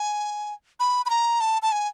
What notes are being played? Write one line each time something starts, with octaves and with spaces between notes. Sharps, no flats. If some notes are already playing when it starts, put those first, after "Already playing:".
Already playing: G#5
B5
B5
A#5
A5
A5
G#5